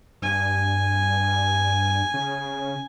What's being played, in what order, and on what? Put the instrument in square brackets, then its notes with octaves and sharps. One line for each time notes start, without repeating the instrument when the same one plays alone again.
[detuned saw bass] G2 [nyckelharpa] G#5
[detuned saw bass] C#3